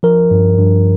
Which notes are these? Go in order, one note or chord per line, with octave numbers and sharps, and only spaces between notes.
F3 A#4
G2
G2